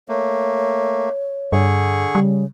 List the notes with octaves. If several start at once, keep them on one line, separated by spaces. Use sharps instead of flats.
A3 A#3 C#5
G2 D3 G#4 C#6
C#3 G3